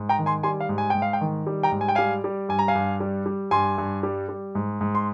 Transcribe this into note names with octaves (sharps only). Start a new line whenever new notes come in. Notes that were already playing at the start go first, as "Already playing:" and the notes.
Already playing: G#2
G5 A#5
D#3
G#5 C6
G3 G#5 C6
F5
G#2
G#5
G#2 G5
F5
G5
D#3
G3
G5 A#5
G#2
G#5
G5
G3 F5 G#5
G3
G2 G#5
A#5
F5 G#5
G2
G3
G3
G2 G#5 C6
G2
G3
G3
G#2
G#2
C6